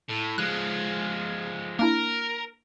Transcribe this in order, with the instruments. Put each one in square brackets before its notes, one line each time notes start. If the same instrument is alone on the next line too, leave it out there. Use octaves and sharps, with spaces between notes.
[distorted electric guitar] A2
[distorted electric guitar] F3 G#3 [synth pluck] F#6
[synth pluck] A#3 D4 E4 [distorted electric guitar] A#4